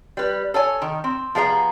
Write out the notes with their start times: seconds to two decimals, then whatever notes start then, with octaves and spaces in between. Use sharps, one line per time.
0.17 G3 B4
0.54 A4 C#5 G#5
0.82 D#3
1.04 C4
1.35 F3 B3 G#4 D5 A#5